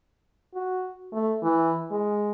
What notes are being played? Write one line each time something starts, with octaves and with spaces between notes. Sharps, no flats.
F#4
A3
E3
G#3